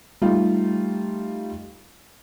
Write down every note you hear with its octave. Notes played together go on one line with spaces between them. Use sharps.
G3 A3 D#4 F4